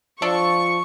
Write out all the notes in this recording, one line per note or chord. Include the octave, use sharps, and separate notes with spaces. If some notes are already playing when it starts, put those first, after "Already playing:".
F3 D4 A4 C#6